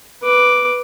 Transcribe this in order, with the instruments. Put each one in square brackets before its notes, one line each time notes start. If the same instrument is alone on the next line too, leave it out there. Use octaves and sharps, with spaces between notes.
[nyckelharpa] B4 D6